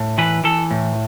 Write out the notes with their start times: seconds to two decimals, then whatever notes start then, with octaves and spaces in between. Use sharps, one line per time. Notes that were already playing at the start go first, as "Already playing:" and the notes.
Already playing: A2
0.18 E3 B4
0.44 E3 A4
0.71 A2